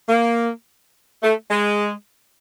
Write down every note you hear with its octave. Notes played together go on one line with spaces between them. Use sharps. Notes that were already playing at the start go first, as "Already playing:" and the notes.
A#3
A3
G#3